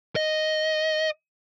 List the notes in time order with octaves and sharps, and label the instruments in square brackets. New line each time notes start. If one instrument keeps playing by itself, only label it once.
[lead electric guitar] D#5